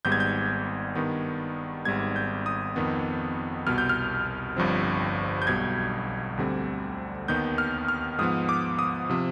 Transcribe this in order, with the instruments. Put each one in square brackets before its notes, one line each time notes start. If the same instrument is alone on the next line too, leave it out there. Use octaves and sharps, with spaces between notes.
[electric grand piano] G#1 G#2 G3 B3 G6
G#6
G6
G2 D#3 B3
G#1 G#2 G3 B3 G#6
G6
D#6
F2 D#3 B3
C2 B2 B3 F6
G6
F6
G1 G2 F3 C4
G6
B1 B2 G3 G#6
D2 D3 G3 C4
D#2 D#3 B3 G6
F6
F6
G#2 F3 B3 D#6
D6
D#6
C3 F3